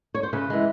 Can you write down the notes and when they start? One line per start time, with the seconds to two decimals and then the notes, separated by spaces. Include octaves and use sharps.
0.15 C#5
0.23 C5
0.33 C#3 B4
0.50 E3 G#3